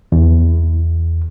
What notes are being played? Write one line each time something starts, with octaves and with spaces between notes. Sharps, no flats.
E2